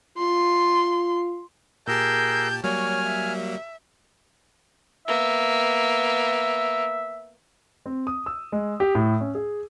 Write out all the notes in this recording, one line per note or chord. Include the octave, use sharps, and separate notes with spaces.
F4 C6
A#2 G4 G#4 A#4 A5 E6 G6
F#3 G3 A#3 C#5 G#5 F6
E5
A#3 B3 E5
C4
D#6
E6
G#3
G4
A2
C#4
G#4